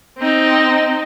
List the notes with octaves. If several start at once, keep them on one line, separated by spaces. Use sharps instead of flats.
C4 D#4